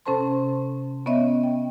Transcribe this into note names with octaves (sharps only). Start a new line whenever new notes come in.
C3 C#4 A4 C5 A5 C6
B3 C#4 C#5 D#5 E5
G5